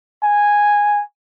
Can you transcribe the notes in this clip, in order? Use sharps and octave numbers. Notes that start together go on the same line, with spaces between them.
G#5